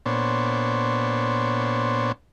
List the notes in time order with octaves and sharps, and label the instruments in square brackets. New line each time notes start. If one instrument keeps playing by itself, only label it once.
[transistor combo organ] A#2 B3 D4 C5 C#5